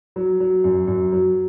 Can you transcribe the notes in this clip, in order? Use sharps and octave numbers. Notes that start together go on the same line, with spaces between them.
F#3
F#3
F#2
F#2
F#3